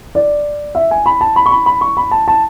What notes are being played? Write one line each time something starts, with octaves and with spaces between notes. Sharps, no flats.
D5
E5
G#5
B5
A5
B5
C#6
B5
B5
C#6
B5
A5
A5